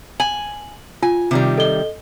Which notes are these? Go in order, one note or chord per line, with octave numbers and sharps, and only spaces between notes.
G#5 F#7
F4 G#5
C3 D#3 G3
A4 D#5 G7